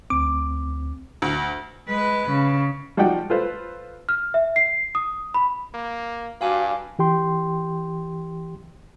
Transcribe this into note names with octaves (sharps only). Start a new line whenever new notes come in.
D2 C4 D6
D2
G#3 B4
C#3
F3 G3 D#4 F#4 F#5 G5
F4 A4 B4 C5
F6
E5
C7
D#6
B5
A#3
G2 F#4 F5 G#5 D6
E3 G4 G5 C6